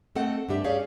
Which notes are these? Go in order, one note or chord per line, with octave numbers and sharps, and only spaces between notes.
A3 C4 A4 D#5 F#5
G2 D4 G4 E5
C#4 G4 G#4 C#5 D5 F5